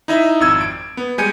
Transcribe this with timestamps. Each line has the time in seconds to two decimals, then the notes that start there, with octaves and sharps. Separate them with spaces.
0.08 D#4 E4 D#5 E5
0.40 G#1 F2 E6 G#6
0.61 D7
0.97 B3
1.18 G3 G#3 G#5 G6 C#7 D#7